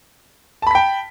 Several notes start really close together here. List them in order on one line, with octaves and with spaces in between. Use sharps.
A5 B5 B6 G5